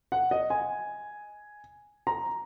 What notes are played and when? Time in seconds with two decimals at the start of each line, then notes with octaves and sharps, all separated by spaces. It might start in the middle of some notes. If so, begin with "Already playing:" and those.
0.12 F#5
0.31 D#5
0.50 G#5
2.07 A#5